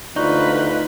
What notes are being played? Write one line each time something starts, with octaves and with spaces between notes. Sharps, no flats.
D2 D#4 F4 B4 D5 C#6 F#6